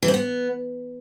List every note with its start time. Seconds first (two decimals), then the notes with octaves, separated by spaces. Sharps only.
0.03 E3
0.08 C4
0.14 B3